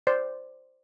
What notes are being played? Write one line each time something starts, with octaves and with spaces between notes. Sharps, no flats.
C5 D5